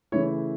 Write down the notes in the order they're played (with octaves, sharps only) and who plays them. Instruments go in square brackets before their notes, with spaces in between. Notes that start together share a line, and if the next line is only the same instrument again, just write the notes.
[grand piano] C#3 E3 A3 E4 C#5